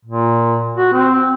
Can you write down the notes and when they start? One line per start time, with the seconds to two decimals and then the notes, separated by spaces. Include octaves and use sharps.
0.05 A#2
0.77 F#4
0.93 C4